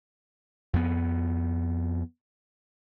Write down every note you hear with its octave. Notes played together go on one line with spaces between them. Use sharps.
F2 B3